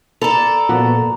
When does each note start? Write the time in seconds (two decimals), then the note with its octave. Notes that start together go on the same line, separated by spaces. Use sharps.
0.22 A4 D5 A#5 B5 F7
0.69 A#2 F3 B3 F#4